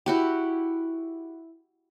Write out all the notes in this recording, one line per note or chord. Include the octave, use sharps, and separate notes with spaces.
E4 F#4 G4